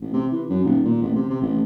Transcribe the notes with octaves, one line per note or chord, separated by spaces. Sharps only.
A1
C3
E3
F#2
D#1
A#2
A1
C3
C3
A1